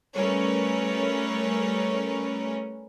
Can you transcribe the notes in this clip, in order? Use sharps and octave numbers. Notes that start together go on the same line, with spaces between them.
G3 A3 C#4 A#4 B4 C#5